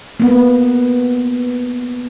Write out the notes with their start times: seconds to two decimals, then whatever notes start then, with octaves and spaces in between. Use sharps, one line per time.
0.20 A#3 B3